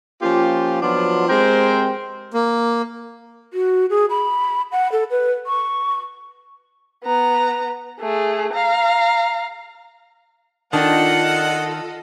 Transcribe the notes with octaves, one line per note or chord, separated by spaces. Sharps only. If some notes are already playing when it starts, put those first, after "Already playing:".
F3 A#3 C#4 F4 G4
F3 F#3 B3 D4 F4
G#3 C4 G4 A#4 C5 G5
A#3
F#4
G#4
B5
F#5
A4
B4
C#6
B3 A#5
A3 G#4
F5 A#5
D#3 D4 F4 A4 D#5 F#5